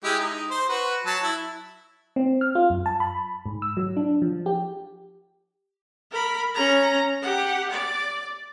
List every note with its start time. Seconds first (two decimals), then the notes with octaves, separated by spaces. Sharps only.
0.04 G#3 E4 G4
0.19 D#4
0.51 C5
0.69 F#4 B4
1.06 F#3 A5
1.23 E4
2.16 C4
2.41 F6
2.55 F4
2.70 F#2
2.86 A5
3.00 B5
3.46 G#2
3.62 E6
3.77 F#3
3.97 D4
4.22 F3
4.46 G4
6.11 A#4 B5
6.54 C#4 A#5
7.22 G4 F#5
7.70 D5